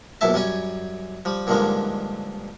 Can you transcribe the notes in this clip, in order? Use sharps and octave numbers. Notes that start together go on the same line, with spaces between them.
A#1 F#2 B2 E4 E5 A5
F#2 G3 C#4 G#5
F3 G3
G2 A#2 D3 D#3 F3 G#3